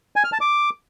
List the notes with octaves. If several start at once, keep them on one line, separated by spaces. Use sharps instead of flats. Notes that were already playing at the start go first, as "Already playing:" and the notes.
G#5
F6
A5
D6